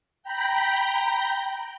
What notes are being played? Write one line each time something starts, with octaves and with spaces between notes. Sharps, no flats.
G5 A#5 B5 G6